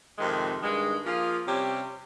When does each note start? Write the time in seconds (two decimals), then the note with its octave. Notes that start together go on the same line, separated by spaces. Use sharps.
0.18 F2 C3 D#3 G#3
0.61 G2 D#3 G#3
1.04 F3 A#3 F4 G#4
1.46 C3 G3 C#4 G4